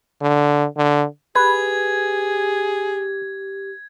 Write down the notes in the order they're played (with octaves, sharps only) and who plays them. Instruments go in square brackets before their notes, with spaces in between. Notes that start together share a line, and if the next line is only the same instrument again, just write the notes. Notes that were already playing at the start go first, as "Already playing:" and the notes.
[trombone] D3
D3
[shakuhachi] G4 [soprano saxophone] G#4 [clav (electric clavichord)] B4 [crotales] G#6